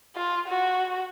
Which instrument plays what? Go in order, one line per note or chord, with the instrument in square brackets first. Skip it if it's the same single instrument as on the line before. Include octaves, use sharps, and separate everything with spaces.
[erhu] F4
F#4